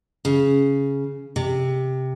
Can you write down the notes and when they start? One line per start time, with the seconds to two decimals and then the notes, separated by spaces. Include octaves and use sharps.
0.25 C#3
1.36 C3